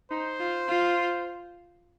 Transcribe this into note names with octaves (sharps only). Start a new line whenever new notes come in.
D#4 C5
F4
F4